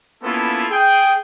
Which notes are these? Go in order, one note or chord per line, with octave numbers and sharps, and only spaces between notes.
A#3 B3 C#4 E4 F4 A4
G#4 G5